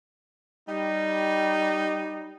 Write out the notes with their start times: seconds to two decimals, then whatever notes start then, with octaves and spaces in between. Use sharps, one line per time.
0.69 G3 D#4